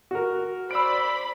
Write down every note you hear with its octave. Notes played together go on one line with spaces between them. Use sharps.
F#4 A#4
C5 D5 B5 E6 D7